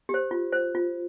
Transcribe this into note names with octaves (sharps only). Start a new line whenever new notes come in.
G4
C5
F4
C5
F4